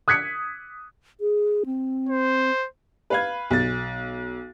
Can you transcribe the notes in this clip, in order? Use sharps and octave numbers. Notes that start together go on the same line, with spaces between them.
D#6 F#6 G#6 B6 C#7
G#4
C4
C5
B4 F5 G#6
B1 A6